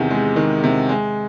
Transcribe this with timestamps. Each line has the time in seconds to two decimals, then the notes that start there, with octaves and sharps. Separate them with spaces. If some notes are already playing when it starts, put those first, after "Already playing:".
Already playing: E2 C3 D#3
0.11 G#3
0.36 D#3
0.64 C3
0.89 G#3